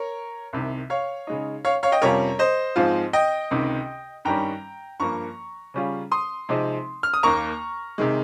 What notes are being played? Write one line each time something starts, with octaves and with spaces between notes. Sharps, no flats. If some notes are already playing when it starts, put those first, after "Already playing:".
Already playing: A#4 C#5
C2 C3 D#3
C#5 F5
C#3 G#3 D#4
C#5 F5
C#5 F5
D#5 G5
F2 C3 G3 C#4 F4 A#4 C#5
C5 D#5
G#2 F3 C4 F4
D#5 G5
C#2 C3 D#3
G2 D#3 G3 C#4 G5 A#5
G2 F3 A#3 A#5 C#6
C#3 G3 C#4 F4
C6 D#6
C3 F3 G#3 C4 D#4
F6
D#6
D#2 D#3 A#3 A#5 C#6
C3 D#3 G#3